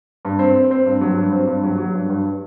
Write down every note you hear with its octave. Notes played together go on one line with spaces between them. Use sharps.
G2
C4
C4
C4
G2
F#3
G2
C4
G2
F#3
F#3
G2
G2